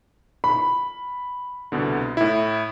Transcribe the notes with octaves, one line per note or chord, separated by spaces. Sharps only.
B5
C2 B2 D3
A2 E4